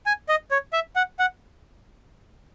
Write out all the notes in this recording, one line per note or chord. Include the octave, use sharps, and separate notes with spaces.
G#5
D#5
C#5
E5
F#5
F#5